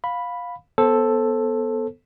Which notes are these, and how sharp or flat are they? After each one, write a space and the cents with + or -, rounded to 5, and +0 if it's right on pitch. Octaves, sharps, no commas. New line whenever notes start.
F5 +15 B5 +0
B3 +0 A4 +0 C5 +25